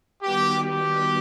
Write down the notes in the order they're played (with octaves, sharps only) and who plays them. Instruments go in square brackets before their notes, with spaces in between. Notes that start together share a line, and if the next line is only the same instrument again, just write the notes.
[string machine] D#3 G3 B3 F#4 B4 [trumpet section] G4
[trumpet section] G4